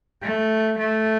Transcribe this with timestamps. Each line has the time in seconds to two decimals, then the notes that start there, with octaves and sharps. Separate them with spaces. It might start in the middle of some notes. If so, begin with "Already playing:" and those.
0.23 A3
0.78 A3